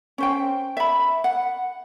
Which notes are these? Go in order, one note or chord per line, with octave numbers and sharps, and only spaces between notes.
C#4 C5 G5
E5 B5
F#5